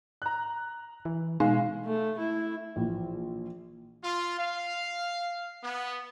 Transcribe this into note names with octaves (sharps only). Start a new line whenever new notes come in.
A#5 F#6
E3
B2 G#3 D#4 F5
A3
E4
A#1 E3
F4
F5
B3